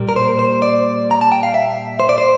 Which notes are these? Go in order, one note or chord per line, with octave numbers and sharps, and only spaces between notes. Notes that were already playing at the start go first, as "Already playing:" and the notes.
Already playing: A#2 G3 A#3
A#4
C5
C5
D5
A#5
A5
G5
F5
E5
C5
D5
C5